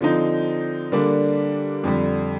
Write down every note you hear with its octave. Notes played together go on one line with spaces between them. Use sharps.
D3 F3 C4 D#4
D3 G3 A#3 D4
F2 D3 G3